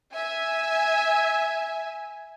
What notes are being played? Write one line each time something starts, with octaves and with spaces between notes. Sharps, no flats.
E5 G#5